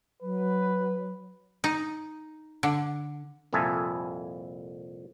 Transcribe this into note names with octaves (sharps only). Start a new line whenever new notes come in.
F#3 B4
D#4
D3
C2 F2 A#2 A4 E5 G#5